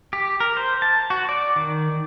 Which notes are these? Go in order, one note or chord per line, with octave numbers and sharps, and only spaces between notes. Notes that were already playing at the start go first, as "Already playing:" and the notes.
G4
A#4
C5
A5
F#4
D5
D#3